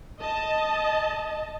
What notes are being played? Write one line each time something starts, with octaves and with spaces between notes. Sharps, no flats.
D#5 A5